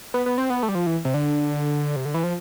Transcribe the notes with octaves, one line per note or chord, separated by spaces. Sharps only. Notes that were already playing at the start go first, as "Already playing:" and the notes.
B3
B3
C4
B3
A3
G3
F3
E3
C3
D3
C3
D3
E3
F3